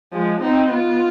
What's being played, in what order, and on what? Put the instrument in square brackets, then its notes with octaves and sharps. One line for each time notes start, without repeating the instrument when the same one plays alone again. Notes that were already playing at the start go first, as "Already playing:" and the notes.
[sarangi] F3 [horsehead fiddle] G#3
[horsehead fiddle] C4 [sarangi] D#4
[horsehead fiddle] B3 [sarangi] F4